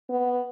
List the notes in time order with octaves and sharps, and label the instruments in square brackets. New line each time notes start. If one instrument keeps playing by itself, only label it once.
[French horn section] B3